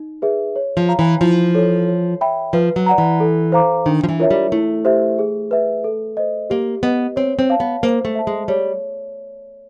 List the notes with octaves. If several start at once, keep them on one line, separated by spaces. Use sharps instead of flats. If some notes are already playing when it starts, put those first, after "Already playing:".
Already playing: D#4
G#4 B4 E5
C#5
F3
F5 A#5
E3
F3 E4
A4 C#5
C#5
E5 G5 B5
F3 B4
F#3
D5 F#5 A#5
E3
A4
C5 F5 A#5 D6
D#3 D4
F3
E3
F4 A#4 C#5 E5
G3
A3 E4
G4 C5 E5
G#4
B4 E5
A4
C5 D#5
A#3 G4
B3 B4 D#5
C4 C#5
C4
F5 A5
B3
A#3 C5
A3
E5 A5
G#3
G3 C#5